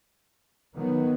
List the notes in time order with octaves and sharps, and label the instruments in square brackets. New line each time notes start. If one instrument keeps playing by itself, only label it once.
[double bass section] D#3 F#3 B3